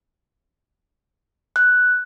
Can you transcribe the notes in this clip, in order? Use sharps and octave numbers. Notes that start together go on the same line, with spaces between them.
F#6